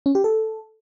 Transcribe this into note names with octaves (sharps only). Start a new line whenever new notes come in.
C#4
G4
A4